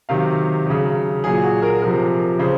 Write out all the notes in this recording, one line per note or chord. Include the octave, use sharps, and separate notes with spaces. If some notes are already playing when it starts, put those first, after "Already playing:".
C3 D#3 F#3 F5
C#3 F#3
A#2 F#3 G#4
F#4
A#4
C3 F3 A#4
C#3 C5